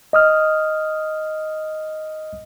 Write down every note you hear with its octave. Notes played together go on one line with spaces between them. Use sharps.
D#5 D#6 F6